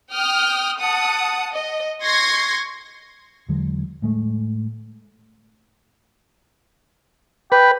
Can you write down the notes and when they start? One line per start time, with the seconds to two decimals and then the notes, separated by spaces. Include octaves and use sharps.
0.14 G5 D#6 F6
0.80 F#5 A5 D#6
1.55 D#5
2.03 C6 C#6 G#6 A#6 C7
3.49 E2 D3 F#3 G#3
4.02 A2 G#3 A3
7.52 B4 G5